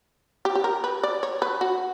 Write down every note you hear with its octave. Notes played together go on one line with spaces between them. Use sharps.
G4
G4
A#4
B4
D5
C#5
B4
F#4